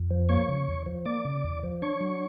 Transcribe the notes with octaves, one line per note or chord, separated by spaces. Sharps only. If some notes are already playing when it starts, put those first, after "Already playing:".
Already playing: F2
F3
A#3 C#5 C#6
C#3
E2
F3
A#3 D5 D6
C#3
E2
F3
D4 C#5 C#6
F#3